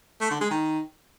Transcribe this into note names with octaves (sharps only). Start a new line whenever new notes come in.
A3
D3
G#3
D#3